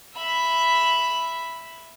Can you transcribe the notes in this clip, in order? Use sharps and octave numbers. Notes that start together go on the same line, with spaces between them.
E5 B5